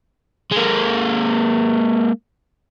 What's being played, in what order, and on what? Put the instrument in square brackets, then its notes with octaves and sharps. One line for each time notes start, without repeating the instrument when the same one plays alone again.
[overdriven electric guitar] G#3 A#3